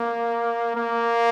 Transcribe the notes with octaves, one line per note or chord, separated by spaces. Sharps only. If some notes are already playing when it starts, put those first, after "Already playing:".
Already playing: A#3
A#3